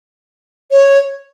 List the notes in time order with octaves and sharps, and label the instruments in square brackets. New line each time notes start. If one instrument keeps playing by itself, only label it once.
[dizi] C#5